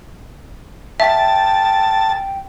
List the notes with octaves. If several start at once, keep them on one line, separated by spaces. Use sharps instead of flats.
E5 G5 A5 B6